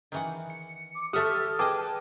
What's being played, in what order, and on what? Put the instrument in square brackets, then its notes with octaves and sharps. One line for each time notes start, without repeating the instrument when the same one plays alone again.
[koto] D#3 E3 F#5
[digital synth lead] C#7
[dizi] D6
[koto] A3 E5 F#5 [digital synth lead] G4 [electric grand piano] A4 D#6 [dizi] F6
[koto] G#4 D#5 [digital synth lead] B4 [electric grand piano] G5 A5 D6